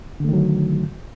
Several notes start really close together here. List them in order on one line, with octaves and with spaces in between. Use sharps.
D3 A3 D#3 F#3